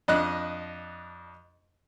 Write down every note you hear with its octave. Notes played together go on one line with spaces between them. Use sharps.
F2 D4 D#5 F#6